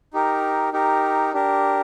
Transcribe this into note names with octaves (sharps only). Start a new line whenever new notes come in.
D#4 G4 A#4
D#4 G4 A#4
D4 G4 A#4